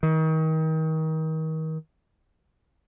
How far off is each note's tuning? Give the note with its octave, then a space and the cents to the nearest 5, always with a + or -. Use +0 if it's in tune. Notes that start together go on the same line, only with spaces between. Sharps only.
D#3 +30